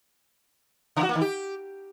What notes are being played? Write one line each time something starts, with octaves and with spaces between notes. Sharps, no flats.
C#3
F#4
A#3
D#3
G4